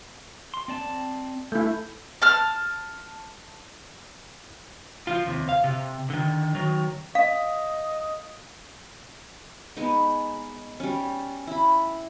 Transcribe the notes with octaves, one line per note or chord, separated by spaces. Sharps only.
C6
C4 D5 A5
A3 E4 G6
A5 F6
F3 F4
D#2 C3
F5
C3
D3 D#3
D#3 F#3
D#5 F5
G#3 B3 D#4
G3 C#4
E4 B5